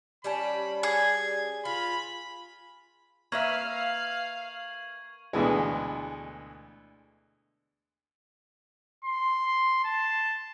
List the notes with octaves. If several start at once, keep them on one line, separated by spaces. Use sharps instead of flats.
G3 C#4 A5 B5
G#4 G#6
F4 B5
A#3 B4 E5 F5 C#6 G#6 F#7
D2 B2 E3 G#3
C6
A5